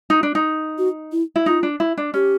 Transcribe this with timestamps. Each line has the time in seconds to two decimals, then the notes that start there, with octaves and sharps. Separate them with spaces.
0.10 D#4
0.23 D4
0.35 D#4
0.78 F#4
1.12 E4
1.36 E4
1.46 D#4 F4
1.63 D4
1.80 E4
1.97 D4
2.14 C#4 G4